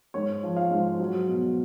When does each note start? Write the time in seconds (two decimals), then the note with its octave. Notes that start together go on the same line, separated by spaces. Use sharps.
0.14 G#2 C#5
0.43 F3
0.57 F5
0.71 G#2
1.00 F#3
1.28 B2